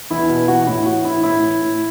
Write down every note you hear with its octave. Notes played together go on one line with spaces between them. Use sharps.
E2 E4
B2
E3 F#4
A2 E4
E3 F#4
E3 E4
A2 E4
E3
A2